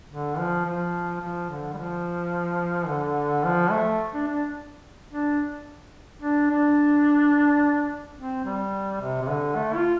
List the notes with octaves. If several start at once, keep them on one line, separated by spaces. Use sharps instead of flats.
D3
F3
F3
F3
D3
G3
F3
D3
F3
A3
D4
D4
D4
D4
D4
C4
G3
C3
C3
D3
A3
F4